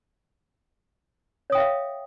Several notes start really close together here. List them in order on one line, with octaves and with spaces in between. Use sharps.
C#5 D#6 G5 E5 F5